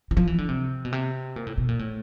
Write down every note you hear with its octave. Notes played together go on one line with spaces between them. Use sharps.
E3
F3
E3
D3
C3
B2
C3
A#2
A2
B2
A#2
A2